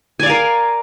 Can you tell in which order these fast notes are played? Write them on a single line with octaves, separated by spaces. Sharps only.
G#5 D5 F5 A#4